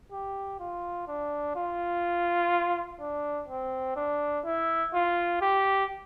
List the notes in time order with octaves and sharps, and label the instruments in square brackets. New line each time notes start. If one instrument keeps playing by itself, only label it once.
[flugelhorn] G4
F4
D4
F4
D4
C4
D4
E4
F4
G4